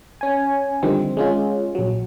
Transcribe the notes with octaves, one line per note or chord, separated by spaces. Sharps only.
C#4 G#5
D3 D#3 F3 G3 C4
G#3 C#4 F4
A#1 F#3